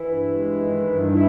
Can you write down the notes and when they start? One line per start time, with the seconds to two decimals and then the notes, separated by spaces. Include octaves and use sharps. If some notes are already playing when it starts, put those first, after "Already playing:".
Already playing: E3 E4
0.08 G2
0.34 G#3
0.60 D#3
0.87 G2
1.12 E3 E4